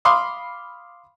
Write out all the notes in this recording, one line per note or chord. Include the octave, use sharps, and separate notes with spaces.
F5 B5 C6 D6 D#6